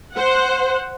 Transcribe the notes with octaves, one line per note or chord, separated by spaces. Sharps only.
C5 F#5